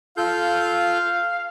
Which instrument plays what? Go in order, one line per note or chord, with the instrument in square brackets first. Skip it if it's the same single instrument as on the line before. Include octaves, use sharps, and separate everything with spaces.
[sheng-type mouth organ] F4 A4 G6 [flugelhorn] F5